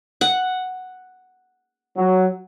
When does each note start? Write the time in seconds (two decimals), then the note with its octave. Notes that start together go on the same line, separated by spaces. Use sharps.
0.21 F#5
1.97 F#3